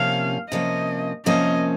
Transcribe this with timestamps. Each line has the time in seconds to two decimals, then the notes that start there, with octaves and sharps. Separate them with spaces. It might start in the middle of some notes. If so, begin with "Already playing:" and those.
Already playing: C3 F3 A#3 C#4 F5
0.50 C3 F3 A#3 C#4 D#5
1.26 C3 F3 A#3 C#4 D#5